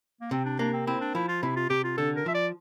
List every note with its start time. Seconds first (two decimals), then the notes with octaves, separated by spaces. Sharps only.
0.21 A#3
0.31 C3 C4
0.45 D4
0.59 A#3 D4
0.73 C4
0.87 C4 E4
1.01 D4
1.15 F3 E4
1.28 F4
1.42 C3 E4
1.56 F4
1.70 C3 G4
1.84 F4
1.97 D3 A4
2.16 A#4
2.26 F3 E5
2.34 D5